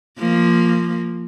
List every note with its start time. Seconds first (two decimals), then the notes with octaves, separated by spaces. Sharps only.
0.18 F3 A#3